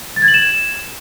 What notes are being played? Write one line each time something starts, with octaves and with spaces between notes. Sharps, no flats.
A6
G#6
F#7
E7